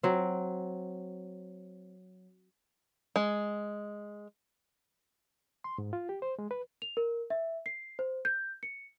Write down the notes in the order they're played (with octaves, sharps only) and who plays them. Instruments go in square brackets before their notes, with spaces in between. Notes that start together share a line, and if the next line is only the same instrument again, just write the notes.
[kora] F#3 C4
[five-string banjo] G#3
[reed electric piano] C6
G#2
F4
G4
C5
G#3
B4
[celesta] F7
A#4
E5
C7
C5
G6
C#7